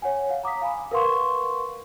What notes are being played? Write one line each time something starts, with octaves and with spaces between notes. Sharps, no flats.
C#5 F#5 G#5
F5 F#5
A#5 D6 D#6 B6
F5 G#5 B5
A#4 B4 F5 F#5 C6 C#6